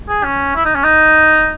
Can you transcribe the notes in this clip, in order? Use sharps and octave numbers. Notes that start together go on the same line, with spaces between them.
G#4
C#4
E4
D#4
C#4
D#4